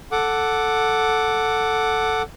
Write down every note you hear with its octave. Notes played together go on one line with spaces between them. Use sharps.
A4 F#5 D6